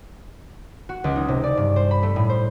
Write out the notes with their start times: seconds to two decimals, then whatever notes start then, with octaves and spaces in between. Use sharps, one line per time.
0.89 F#4
1.04 C#2
1.16 D#4
1.28 C3
1.43 D5
1.57 G2
1.76 C5
1.91 B5
2.03 A3
2.16 A2
2.29 C5